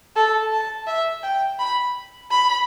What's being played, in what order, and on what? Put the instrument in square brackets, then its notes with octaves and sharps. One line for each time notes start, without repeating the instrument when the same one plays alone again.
[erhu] A4
A5
E5
G5
B5
B5